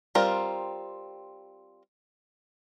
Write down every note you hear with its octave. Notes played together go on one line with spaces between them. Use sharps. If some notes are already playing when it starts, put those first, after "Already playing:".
G3 C4 F4 A#4